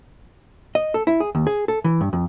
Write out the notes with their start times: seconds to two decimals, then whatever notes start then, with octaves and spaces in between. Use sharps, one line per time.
0.75 D#5
0.94 A4
1.07 E4
1.20 G#4
1.35 D#2
1.47 G#4
1.68 A4
1.84 E3
2.01 G2
2.13 F2